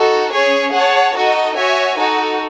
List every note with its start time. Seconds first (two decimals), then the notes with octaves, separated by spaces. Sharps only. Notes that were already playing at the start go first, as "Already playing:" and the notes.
Already playing: D#4 F#4 A4
0.33 C#4 G#4 C#5
0.73 G#4 C#5 F#5 A5
1.15 D#4 F#4 A4 D#5
1.57 F#4 C#5 E5 G#5
1.98 D#4 F#4 A4